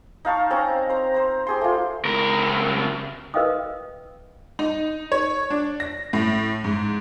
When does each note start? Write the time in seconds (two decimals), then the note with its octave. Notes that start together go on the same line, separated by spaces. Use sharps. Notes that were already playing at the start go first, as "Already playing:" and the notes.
0.25 D#4 F5 A5 C#6
0.50 C4 C#4 F5 A#5
0.89 C5 A#5
1.14 C5 A#5
1.47 G4 G#4 C6
1.61 A3 F4
2.05 C#2 A#4
3.34 A#4 B4 D#5 F5 G5 D#6
4.59 D#4
5.12 C#5
5.50 D4
5.80 A#6
6.13 A2
6.64 G#2